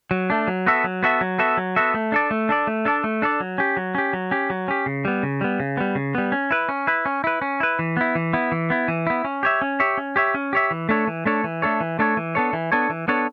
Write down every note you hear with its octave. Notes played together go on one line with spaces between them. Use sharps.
F#3
A3 D4
F#3
B3 F#4 A4 E5
F#3
B3 F#4 A4 E5
F#3
B3 F#4 A4 E5
F#3
B3 F#4 A4 E5
A3
D4 A4 D5
A3
D4 A4 D5
A3
D4 A4 D5
A3
D4 A4 D5
F#3
C#4 G4
F#3
C#4 G4
F#3
C#4 G4
F#3
C#4 G4
C#3
G3 B3
C#3
G3 B3
C#3
G3 B3
C#3
G3 B3
C#4
E4 B4
C#4
E4 B4
C#4
E4 B4
C#4
E4 B4
E3
B3 E4
E3
B3 E4
E3
B3 E4
E3
B3 E4
C#4
G4 C#5 E5
C#4
G4 C#5 E5
C#4
G4 C#5 E5
C#4
G4 C#5 E5
E3
A3 D4 A4 C#5
E3
A3 D4 A4 C#5
E3
A3 D4 A4 C#5
E3
A3 D4 A4 C#5
E3
B3 D4 A4 C#5
E3
B3 D4 A4 C#5
E3
B3 D4 A4 C#5